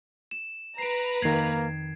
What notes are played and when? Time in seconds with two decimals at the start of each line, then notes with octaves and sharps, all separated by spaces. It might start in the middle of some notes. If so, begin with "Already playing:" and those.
0.31 E7
0.78 B4 A#5 C7 D7
1.22 F2 D#3 A#3 G#6 C7